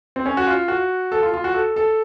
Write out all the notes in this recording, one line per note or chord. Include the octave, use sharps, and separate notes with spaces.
C4
C#4
F#4
F4
F#4
A4
F4
F4
F#4
A4
A4